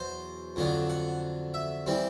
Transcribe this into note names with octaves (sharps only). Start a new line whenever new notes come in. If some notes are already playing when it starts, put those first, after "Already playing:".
Already playing: E2 B2 F#3 C5
F2 D3 F#3 B3 D4
F#5
E5
E3 G3 C4